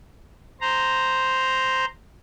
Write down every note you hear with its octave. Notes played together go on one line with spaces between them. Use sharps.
C5 A#5